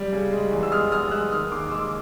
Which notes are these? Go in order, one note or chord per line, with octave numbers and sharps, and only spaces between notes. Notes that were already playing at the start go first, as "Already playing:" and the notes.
Already playing: G3
C#3
G#3
E2
E6
G#3 D#6 F6
G#3 D#6 F6
G#3 E6 F#6
D#3 D#6 F6
D#2 C6 D6
G#3 D6 E6